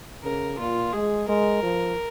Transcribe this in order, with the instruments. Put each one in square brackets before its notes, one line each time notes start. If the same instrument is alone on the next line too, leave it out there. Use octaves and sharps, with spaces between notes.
[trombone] C#3 [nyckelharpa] A#4
[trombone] A#2 [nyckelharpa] F4
[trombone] G#3 [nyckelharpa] G#4
[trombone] G#3 [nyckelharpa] A#4
[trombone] F3